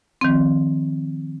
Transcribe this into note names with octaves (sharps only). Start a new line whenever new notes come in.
D#3 F3 C4